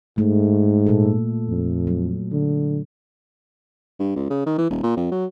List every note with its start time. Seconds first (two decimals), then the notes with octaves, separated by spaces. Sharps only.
0.18 G#2 A3
0.87 A#2 A4
1.49 F2
1.87 F#3
2.32 D3
3.99 G2
4.16 C#2
4.30 C#3
4.46 D#3
4.58 E3
4.70 D#1
4.83 A#2
4.97 F2
5.12 F#3